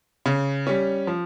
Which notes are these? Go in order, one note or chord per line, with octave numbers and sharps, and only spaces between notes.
C#3
G3 C#4
F3